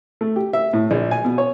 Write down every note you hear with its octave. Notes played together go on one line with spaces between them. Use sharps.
A3
G4
E5
A2
A#1
G#5
B2
C#5